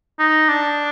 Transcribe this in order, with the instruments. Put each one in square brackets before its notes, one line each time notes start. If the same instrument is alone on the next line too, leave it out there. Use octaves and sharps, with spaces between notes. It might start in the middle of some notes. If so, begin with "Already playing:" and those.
[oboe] D#4
D4